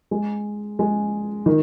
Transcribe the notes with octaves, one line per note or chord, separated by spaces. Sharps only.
G#3
G#3
D#3